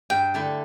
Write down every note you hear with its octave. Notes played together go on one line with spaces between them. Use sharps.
G2 G5
D3 A3 E4